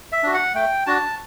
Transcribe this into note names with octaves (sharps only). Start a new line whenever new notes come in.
E5
D4 F#4
F#5
A3 G5
D4 F#4 A5